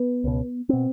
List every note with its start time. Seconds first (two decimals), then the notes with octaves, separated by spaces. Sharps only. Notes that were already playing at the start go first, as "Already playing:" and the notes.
Already playing: B3
0.24 C#2 B2
0.69 B2 C4